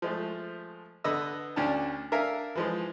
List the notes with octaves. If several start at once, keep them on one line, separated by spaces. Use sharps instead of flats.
F3 G#3 A3
D3 B3 B4 D#5 E6
D2 C#4 D4 G5 A5
D4 A#4 E5 F5 G#5 A#5
E3 F3 G#3